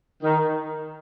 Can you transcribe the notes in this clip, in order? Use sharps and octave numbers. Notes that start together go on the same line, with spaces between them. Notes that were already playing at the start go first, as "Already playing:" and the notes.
D#3